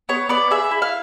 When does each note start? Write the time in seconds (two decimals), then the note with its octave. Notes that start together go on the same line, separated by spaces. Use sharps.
0.09 B3 C#5
0.29 B3 D5
0.51 G#4 E5
0.71 E4
0.82 F5